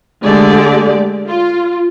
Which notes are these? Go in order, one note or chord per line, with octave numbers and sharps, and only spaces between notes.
D3 G#3 A3 G4 D5
F4